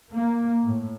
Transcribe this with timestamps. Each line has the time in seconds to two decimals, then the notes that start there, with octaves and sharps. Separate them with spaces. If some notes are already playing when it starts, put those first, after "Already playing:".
0.14 A#3
0.67 A2